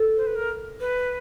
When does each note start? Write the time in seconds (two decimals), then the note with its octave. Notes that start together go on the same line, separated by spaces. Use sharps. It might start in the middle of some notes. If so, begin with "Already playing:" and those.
Already playing: A4
0.17 C5
0.27 B4
0.36 A#4
0.80 B4